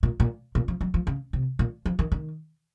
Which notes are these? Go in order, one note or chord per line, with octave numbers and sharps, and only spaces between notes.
A#2
A#2
A#2
F3
F#3
F3
C#3
C3
A#2
F3
D#3
D#3